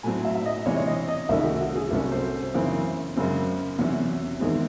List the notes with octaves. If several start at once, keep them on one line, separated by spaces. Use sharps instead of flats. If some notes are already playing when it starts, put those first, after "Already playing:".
A2 F#3 C4 G#5
E5
E5
D#5
C3 E3 G#3 C4 C#5
C#5
D#5
D#5
C2 C3 D#3 A3 C#4 E5
G#4
F#4
F#4
G#4
C2 C3 F#3 C#4 A4
C5
F#2 C#3 E3 C4
F#2 C#3 G#3 C4
E2 C3 F#3 C#4 F#4
E2 D#3 G#3 C4